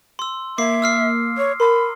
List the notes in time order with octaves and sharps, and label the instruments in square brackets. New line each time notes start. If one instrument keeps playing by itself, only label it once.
[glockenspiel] C6 E6
[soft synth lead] A#3 [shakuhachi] E5 [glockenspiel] D6 C7
[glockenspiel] E6 F6 C7
[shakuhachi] C#5
[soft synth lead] A#4 [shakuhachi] B5 [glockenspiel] C6